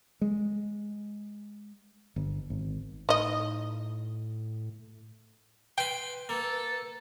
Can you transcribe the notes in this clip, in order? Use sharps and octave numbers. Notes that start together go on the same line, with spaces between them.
G#3
G1
G#1
A2 D#4 D#5
B4 G5 B5 C6
A#3 A4